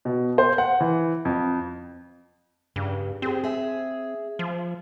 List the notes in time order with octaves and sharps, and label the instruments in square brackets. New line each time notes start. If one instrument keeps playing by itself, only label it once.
[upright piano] B2
C5
F#5
E3
F2
[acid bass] G2 [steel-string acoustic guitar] C#3
[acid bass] C4 [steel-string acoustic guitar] G4 G#4
[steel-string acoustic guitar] G#4 E5
[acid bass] F3